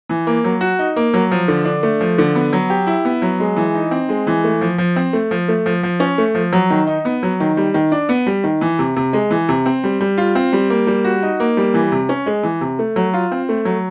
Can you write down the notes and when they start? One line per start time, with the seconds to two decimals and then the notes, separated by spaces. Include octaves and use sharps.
0.09 E3
0.27 A#3
0.44 F#3
0.61 F#4
0.79 D#4
0.96 A#3
1.14 F#3
1.31 F3
1.48 D3
1.65 D4
1.83 A3
2.01 F3
2.18 D3
2.35 B3
2.53 F#3
2.70 G4
2.87 E4
3.05 B3
3.22 F#3
3.40 G#3
3.57 E3
3.74 D#4
3.91 C4
4.09 G#3
4.27 E3
4.44 A3
4.61 F3
4.78 F3
4.96 C4
5.13 A3
5.31 F3
5.48 A3
5.66 F3
5.83 F3
6.00 C#4
6.18 A3
6.35 F3
6.53 F#3
6.70 D#3
6.87 D#4
7.05 B3
7.23 F#3
7.40 D#3
7.57 G3
7.74 D#3
7.92 D4
8.09 B3
8.27 G3
8.44 D#3
8.61 E3
8.79 C3
8.96 C3
9.13 G#3
9.31 E3
9.49 C3
9.66 C4
9.84 G3
10.00 G3
10.18 F4
10.35 C4
10.53 G3
10.70 A#3
10.87 G3
11.04 F#4
11.23 D#4
11.40 A#3
11.57 G3
11.74 E3
11.92 C3
12.09 C#4
12.26 G#3
12.43 E3
12.61 C3
12.79 A3
12.96 F#3
13.14 F4
13.32 C4
13.49 A3
13.65 F#3